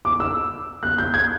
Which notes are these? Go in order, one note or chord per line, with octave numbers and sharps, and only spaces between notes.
D6
E6
F#6
G6
G#6